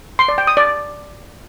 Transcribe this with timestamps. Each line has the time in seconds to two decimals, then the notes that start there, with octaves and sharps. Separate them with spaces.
0.19 C6
0.28 D5
0.38 G5
0.47 D#6
0.57 D5